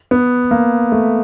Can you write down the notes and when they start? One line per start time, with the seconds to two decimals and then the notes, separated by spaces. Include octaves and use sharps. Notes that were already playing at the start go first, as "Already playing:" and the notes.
0.11 B3
0.51 A#3
0.92 A3